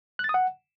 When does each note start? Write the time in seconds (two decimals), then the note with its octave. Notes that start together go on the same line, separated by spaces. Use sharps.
0.19 F#6
0.24 A6
0.29 D#6
0.34 F#5